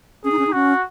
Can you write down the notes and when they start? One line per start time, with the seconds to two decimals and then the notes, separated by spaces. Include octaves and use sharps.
0.24 C#4 G#4
0.32 D#4
0.39 C#4
0.47 D#4
0.52 C#4 F#4